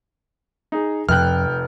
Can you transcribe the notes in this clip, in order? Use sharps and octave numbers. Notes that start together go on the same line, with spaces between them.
D#4 G#4
F1 F2 G5 F6 F#6